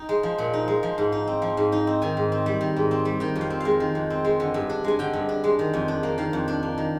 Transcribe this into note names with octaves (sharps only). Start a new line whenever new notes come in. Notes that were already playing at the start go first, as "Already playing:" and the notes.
Already playing: D#4 G5
G#3
F3
A#2
D#4
G#3
F3
G#2
D#4
C4
F3
G#2
D#4
C4
D#3 G#5
G#2
C4
G3
D#3
G#2
C4
G3
D#3 G5
F2
F5
C4
G#3 F5
D#3
F2
C4
G#3
D3
G2
D4
G#3 G#5
D3 G5
G2
D4
G#3
D#3
F2
D4
A#3
D#3 F5
F2
D4
A#3
D#3